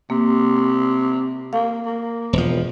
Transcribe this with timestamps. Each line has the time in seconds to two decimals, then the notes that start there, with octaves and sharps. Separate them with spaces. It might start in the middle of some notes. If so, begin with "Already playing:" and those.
0.10 C3 A#3
1.53 A#3 F5
1.85 A#3
2.33 E1 F3